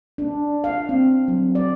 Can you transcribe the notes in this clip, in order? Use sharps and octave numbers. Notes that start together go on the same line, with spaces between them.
D4
F5
C4
F#3
D5